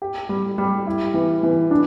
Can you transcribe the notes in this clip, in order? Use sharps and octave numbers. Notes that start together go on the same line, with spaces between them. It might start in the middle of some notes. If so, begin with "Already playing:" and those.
G4
G3
G3
E4
E3
E3
D4